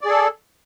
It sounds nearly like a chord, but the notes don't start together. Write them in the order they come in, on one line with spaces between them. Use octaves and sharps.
D5 G#4 A4